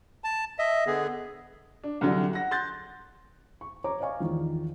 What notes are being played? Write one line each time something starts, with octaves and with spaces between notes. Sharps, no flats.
A5
D#5 E5
D3 B3 G#4
D4
C2 D3 F#3
F#5 A#6
C6 F#6 G6 A6
C#6
C#5 A#5 D6
D5 D#5 F5 G#5 C#6
E2 D#3 F3